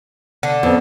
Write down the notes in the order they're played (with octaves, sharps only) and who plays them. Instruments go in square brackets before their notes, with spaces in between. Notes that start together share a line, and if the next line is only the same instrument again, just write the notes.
[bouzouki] D3
[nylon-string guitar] F2 [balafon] B3 B4